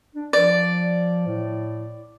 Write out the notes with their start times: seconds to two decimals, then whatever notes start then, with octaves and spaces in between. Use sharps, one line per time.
0.15 D4
0.33 F3 D5
1.27 A2